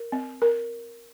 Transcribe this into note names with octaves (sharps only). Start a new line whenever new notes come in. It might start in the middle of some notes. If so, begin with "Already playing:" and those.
Already playing: A#4
C4
A#4